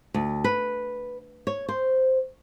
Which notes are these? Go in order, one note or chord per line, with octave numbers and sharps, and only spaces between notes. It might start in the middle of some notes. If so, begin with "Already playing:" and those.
D2
B4
C#5
C5